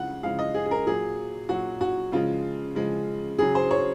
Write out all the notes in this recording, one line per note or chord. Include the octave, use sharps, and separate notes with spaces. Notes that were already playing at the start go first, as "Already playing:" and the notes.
Already playing: C#3 F3 G#3 F#5
C#3 F3 G#3 F5
D#5
G#4
G#4
A#4
A#2 F#3 G#4
A#2 F#3 F#4
F#4
C#3 F3 G#3 F4
C#3 F3 G#3
C#3 F#3 G#4
C5
C#5